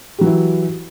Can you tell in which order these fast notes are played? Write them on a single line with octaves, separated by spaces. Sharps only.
G4 F#3 E3 E4